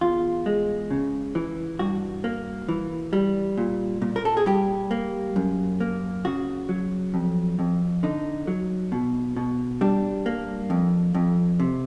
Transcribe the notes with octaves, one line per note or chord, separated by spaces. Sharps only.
E2 F4
G#3
C#3
E3
G2 F#4
A#3
E3
G3
A#2
A#2
A#4
A4
G#4
G3 G4
A#3
F#2
A#3
C#3 F#4
F#3
F2
F2
D3 D#4
F#3
B2
B2
G3 D4
A#3
F2
F2
C3